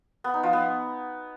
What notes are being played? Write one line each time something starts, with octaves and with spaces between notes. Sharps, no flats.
B3
D#4
F3
B3